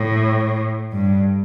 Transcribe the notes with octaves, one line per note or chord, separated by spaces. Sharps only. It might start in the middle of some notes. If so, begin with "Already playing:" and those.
Already playing: A2
G2